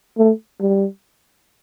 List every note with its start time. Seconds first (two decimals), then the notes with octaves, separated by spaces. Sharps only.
0.18 A3
0.60 G3